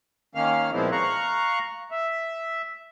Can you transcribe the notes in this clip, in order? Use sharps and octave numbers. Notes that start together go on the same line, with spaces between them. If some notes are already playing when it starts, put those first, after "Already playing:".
D#3 A#3 C#4 F5 F6
A#2 F3 G#3 B3 C4 E4
F5 A#5 C#6 F#6
E5